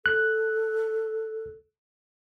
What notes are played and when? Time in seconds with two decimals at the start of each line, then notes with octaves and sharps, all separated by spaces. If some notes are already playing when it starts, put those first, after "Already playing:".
0.06 A4 F#6